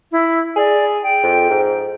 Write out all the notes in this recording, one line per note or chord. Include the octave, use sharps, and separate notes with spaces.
E4
G#4 D5
G5
F2
G#2